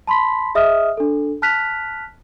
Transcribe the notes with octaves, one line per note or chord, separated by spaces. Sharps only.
A5 B5 C6 B6
G#4 D#5 E5 D#6 F6
D4 A4
A5 F6 F#6 B6 F7